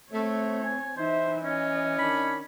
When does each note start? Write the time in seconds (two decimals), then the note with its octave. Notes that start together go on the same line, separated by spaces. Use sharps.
0.12 A3 C4 C#5
0.64 G#5
0.97 E3 D#4 C5 E5
1.44 C#4 D#5
1.98 D#3 D4 B5